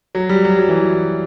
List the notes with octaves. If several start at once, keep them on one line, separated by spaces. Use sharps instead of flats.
F#3
G3
F#3
F#3
E3